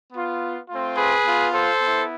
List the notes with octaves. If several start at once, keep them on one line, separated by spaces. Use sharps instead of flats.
B3 F4
A3 C4 F4
G#4 B4
B3 F4
A4 C5
B3 E4